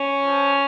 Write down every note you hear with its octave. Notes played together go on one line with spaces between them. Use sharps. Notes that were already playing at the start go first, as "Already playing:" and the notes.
Already playing: C#4
F3